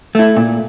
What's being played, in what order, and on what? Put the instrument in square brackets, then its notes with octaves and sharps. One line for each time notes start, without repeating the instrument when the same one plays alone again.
[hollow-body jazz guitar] A3 E4
A#2